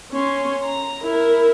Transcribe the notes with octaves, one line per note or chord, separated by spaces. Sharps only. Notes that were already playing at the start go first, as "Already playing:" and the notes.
C#4 C6
A#5
E4 A#4